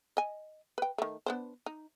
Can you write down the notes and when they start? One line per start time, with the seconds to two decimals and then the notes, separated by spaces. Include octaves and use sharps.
0.17 D#5 G#5
0.78 B4 G5
0.98 D#3 A3
1.26 B3 D4 C5
1.66 D#4